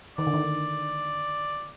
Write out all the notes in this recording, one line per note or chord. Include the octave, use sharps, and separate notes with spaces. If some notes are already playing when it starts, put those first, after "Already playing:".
D#3 D5
D3
D#3